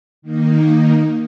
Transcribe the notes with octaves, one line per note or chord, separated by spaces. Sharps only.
D#3 A#3 D#4